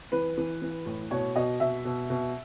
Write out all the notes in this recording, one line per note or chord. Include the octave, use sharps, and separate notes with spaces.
E3 B4
E3
E3
A2
B2 C#5
B2 D#5
B2 E5
B2
B2